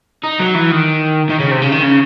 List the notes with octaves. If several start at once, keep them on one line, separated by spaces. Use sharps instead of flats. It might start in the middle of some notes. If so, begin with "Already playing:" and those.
D#4
F#3
E3
D#3
D#3
C#3
C3
C#3
D#3
C#3